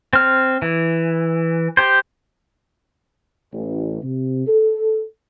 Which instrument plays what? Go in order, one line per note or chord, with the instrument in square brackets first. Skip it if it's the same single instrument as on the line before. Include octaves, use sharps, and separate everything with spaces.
[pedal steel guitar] C4 F6
E3
G4 C5
[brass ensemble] A1
C3
A4